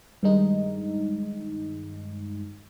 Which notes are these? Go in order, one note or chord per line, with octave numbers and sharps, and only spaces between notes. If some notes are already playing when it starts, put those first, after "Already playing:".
G2 D#3 G#3 D#4